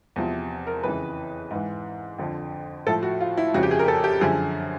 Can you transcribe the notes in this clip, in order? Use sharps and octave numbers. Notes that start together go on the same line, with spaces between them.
E2 C3 F3
A#4
F2 C#3 E3 B4
G#2 E3
F2 D3 F3
A2 F3 A4
F#4
F4
E4
F2 C#3 F3 F#4
G4
G#4
A#4
A4
G4
F#2 D3 F3 G#4